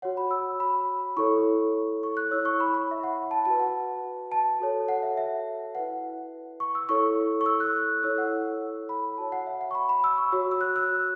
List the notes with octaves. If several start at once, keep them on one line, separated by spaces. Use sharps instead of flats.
F#4 C#5 F#5
B5
E6
B5
E4 A4 C#5 C#6
C#6
F#6
E4 C#5 E6
C#6
B5
C#6
B5
E5
F#5
A5
F#4 B4 A5
F#5
A5
F#4 A4 C#5
F#5
E5
E5
E4 B4 F#5
C#6
E6
E4 A4 C#5 C#6
C#6
E6
F#6
E4 A4 C#5 E6
F#5
B5
F#4 C#5 A5
F#5
E5
F#5
C#6
B5
B5
E6
C#6
F#4 C#5 E6
E6
F#6
E6